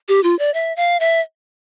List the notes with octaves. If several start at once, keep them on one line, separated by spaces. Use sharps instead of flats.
G4
F4
D5
E5
F5
E5